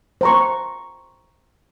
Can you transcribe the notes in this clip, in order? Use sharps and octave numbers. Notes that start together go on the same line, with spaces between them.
C5 A#5 C#6